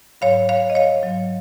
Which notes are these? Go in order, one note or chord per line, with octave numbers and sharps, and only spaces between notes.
G#2 F#3 C#5 F5
C#5 F5
D#5
C#5 F5
G#2 F#3